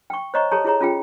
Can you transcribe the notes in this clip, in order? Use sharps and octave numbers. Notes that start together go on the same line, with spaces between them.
G5 C#6
C5 C#5 D#5 A#5 C#6
G4 A4 C#5 A5 A#5
E4 G#4 C#5 A#5
C#4 F4 G#4 G5